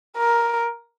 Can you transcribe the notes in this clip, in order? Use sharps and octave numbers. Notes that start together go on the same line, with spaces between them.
A#4